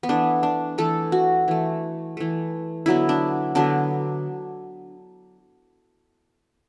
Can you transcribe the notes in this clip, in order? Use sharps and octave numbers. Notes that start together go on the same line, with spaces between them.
B3
E3 A3 D4
D4
E3 A3 A4
F#4
E3 A3
E3 A3
D3 F#3 B3 E4
D4
D3 F#3 B3 D4